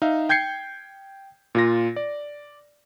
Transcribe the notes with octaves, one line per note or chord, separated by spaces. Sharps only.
D#4 E5 F5
G5 G6 G#6 C7 C#7
A#2 F4 A#6
D5